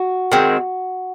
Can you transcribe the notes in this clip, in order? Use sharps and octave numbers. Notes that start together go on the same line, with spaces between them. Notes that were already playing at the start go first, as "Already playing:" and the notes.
Already playing: F#4
D#3 G#3 C4